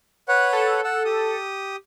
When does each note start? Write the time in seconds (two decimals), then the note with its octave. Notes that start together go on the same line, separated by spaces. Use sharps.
0.28 B4 C#5 F#5
0.53 A4
0.84 F#5 E6
1.05 G4 D#6